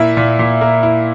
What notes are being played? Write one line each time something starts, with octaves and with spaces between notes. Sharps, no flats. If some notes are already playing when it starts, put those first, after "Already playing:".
Already playing: A#2 A#3 E4 E5
A#2
A#2
A#3
E4